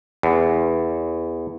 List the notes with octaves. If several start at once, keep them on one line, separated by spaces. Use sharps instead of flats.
E2